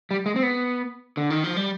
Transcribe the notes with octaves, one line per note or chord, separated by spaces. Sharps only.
G3
G#3
C4
B3
D3
D#3
F3
G3